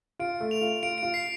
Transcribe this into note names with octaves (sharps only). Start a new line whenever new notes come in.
F4 D7
A3
F7
F4
F4 D7
F4 D7
C7